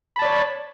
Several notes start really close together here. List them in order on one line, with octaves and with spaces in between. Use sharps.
B5 A5 D5 C#5